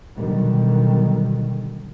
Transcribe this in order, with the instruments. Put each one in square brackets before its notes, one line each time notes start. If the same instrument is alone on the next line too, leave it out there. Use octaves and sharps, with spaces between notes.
[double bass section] B2 D3 D#3 F#3 G3